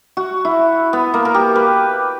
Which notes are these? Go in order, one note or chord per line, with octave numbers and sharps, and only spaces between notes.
F#4
E4
B3
A#3
A#4
G4
B4